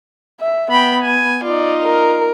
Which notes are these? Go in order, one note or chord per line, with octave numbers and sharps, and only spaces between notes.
E5
B3 G5 B5
G#5
D#4 F4 D5
A#4